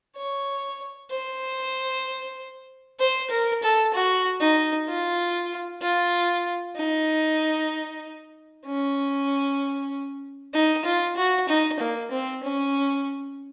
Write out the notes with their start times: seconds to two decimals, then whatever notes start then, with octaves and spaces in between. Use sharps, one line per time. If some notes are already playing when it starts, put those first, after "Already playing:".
0.16 C#5
1.11 C5
3.00 C5
3.31 A#4
3.63 A4
3.94 F#4
4.41 D#4
4.88 F4
5.82 F4
6.76 D#4
8.66 C#4
10.54 D#4
10.85 F4
11.17 F#4
11.49 D#4
11.80 A#3
12.11 C4
12.43 C#4